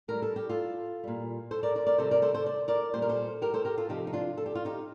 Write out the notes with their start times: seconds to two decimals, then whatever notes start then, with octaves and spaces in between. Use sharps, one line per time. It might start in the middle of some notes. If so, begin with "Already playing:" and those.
0.08 A2 G3 A#4
0.22 A4
0.36 G4
0.49 F4 A4
1.03 A#2 G3
1.51 A4 C5
1.63 A#4 D5
1.75 A#4 D5
1.87 A#4 D5
1.98 C3 D#3 G3 A4 C5
2.11 A#4 D5
2.22 A4 C5
2.34 A4 C5
2.46 D5
2.68 A#4 D5
2.94 A#2 G3 C5
3.02 A#4
3.09 A4 C5
3.42 G4 A#4
3.54 A4 C5
3.65 G4 A#4
3.77 F4 A4
3.89 C3 F3 D#4 G4
4.07 D#4
4.13 D4 F4
4.37 A4
4.46 G4
4.55 F4
4.65 D#4 G4